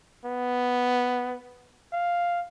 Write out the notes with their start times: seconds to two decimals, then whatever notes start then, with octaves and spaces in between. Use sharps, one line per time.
0.25 B3
1.93 F5